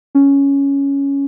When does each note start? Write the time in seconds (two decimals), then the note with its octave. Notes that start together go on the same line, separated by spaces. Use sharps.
0.15 C#4